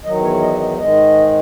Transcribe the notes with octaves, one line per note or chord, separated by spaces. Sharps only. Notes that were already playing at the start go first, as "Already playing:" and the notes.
E2 D#3 F#3 D#5
C#5
D#5
D#5
G#2 D#3 G#3 D#5